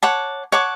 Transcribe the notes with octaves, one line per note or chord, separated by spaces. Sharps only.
C#5 F#5 A5 D6
C#5 F#5 A5 D6